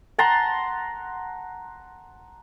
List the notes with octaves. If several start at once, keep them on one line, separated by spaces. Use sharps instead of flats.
F#5 A5 A#5 C6